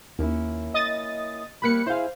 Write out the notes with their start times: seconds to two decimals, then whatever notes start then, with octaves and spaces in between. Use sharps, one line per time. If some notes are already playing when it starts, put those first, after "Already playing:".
0.19 D#2 A#3 C#4 E4
0.74 D#5 D#6 A6
1.62 G3 A#3 C4 B5 F#6 C#7
1.86 E4 G#4 C5 F5